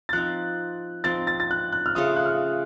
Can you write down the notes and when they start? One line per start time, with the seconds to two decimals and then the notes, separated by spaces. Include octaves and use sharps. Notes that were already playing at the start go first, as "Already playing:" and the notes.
0.09 A6
0.13 F3 C4 D#4 F#6
1.04 F3 C4 D#4 A6
1.27 A6
1.40 A6
1.51 F#6
1.72 F#6
1.86 F6
1.95 C#3 A3 C#4 F4 D#6
2.16 F#6
2.26 F6